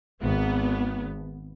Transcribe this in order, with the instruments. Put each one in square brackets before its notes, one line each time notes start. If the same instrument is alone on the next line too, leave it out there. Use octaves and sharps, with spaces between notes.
[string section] G#1 B3